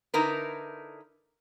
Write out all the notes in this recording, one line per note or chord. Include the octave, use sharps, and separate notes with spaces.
D3 D#4 E4 A#4 B4